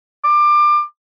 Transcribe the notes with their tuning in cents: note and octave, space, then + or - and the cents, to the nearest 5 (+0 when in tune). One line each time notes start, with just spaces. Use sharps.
D6 +25